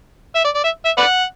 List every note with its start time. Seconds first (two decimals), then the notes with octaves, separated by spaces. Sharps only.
0.35 E5
0.45 D5
0.55 D5
0.64 E5
0.85 E5
0.98 B4 D5 F#5